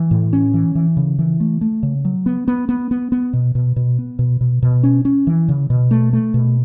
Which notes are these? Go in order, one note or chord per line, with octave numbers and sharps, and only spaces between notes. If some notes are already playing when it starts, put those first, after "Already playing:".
Already playing: E3
A2
C#4
E3
E3
C#3
E3
A3
A3
C#3
F#3
B3
B3
B3
B3
B3
B2
B2
B2
B3
B2
B2
B2
C#4
C#4
E3
C#3
B2
A3
A3
B2